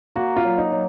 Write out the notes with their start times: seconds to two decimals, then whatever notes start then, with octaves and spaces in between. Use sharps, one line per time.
0.16 A#3 F#4
0.36 F4
0.44 F#3
0.58 D#4
0.72 F#3